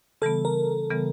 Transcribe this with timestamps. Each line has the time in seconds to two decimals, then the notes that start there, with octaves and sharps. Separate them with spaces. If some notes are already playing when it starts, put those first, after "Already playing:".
0.22 C#3 E3 G3 B3 A4
0.45 A#4
0.90 C#3 E3 G3 B3